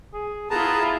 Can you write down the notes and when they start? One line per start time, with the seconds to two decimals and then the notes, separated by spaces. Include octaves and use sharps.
0.14 G#4
0.50 B3 E4 F4 G#4 A5 A#5